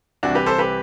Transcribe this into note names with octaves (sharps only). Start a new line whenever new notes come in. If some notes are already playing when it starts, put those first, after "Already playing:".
C2 C3 E3 D4 F#4
G4 B4
A4 C5
G4 B4